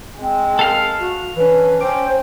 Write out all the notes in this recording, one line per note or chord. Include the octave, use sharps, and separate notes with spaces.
G#3 C4
A4 A#4 F5 F6
F#4
E3 C#4 D4 B4
C4 C#4 C5 D6